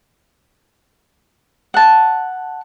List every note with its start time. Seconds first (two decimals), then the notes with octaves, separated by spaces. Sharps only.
1.74 F#5 A5